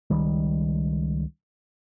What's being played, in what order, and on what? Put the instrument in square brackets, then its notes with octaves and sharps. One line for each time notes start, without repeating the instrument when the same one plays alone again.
[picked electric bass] C#2 D#3 G3